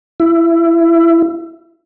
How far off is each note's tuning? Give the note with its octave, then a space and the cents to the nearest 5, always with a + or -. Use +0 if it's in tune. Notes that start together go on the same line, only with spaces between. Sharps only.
E4 +20